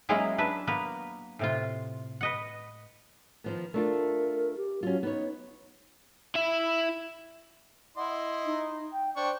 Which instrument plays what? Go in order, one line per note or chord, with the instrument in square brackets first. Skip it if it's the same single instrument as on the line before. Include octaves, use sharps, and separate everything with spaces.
[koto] F#3 G#3 A#3 C#4 E4 G#4
D4 B4 E5
A#3 B3 B4
A2 C3 F4
B4 D#5 F#5
[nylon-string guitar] D#3 F3 B3
[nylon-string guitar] A3 D4 F4 [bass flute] A#4
[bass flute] G4
[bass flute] F#3 [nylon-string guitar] C#4 F4
[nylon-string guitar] B3 C#5 [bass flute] D#4
[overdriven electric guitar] E4 E5
[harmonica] E4 D#5 C6 [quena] F#5
[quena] D#4
G5
[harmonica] D4 G5 C#6 [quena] C5